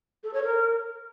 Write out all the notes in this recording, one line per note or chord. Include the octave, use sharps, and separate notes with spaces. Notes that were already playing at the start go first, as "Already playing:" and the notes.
A4
C#5
A#4